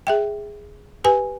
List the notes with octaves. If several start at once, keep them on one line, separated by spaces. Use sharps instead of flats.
G#4 E5 G5
G4 B4 G#5